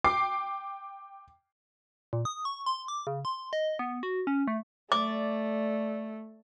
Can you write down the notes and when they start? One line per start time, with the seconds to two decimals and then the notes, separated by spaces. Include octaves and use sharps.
0.04 G5 D6 C7
2.13 A#2
2.25 D#6
2.45 C#6
2.66 C6
2.88 D6
3.07 C#3
3.25 C6
3.53 D#5
3.79 B3
4.03 F#4
4.27 C#4
4.48 A3
4.92 A3 D5 D6